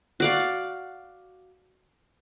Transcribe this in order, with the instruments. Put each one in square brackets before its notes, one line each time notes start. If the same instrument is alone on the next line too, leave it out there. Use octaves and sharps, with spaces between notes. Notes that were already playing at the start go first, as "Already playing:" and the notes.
[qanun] F#4 D5 F5